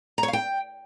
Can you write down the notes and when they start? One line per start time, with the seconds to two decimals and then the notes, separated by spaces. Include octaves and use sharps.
0.18 A#5
0.23 C#5
0.28 F5
0.33 G5